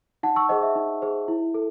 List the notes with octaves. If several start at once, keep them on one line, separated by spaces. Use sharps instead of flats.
D#4 F#5 A5
C#6 E6
G#4 C5 D#5 F#5
E5
D#4
G#4 C5
E4
A4